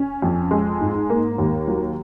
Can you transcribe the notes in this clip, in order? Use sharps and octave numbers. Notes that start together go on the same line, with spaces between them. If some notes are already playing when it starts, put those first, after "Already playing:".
Already playing: C#4
F2
G#3
G#2
A#3
D#2
F#3